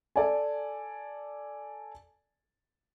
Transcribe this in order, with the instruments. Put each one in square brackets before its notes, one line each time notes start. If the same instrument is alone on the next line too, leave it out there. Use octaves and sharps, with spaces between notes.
[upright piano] A4 D5 G#5